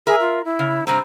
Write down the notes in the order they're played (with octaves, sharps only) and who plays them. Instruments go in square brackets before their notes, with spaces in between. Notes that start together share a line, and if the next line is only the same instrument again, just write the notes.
[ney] G#4 [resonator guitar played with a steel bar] A#4 E5
[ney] F4
E4
[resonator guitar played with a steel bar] C#3
[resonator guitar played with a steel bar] G2 C3 C4 [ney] A#5